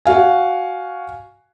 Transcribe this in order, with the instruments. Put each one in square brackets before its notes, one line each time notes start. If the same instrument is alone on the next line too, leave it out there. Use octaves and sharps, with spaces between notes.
[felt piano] F#4 F5 G#5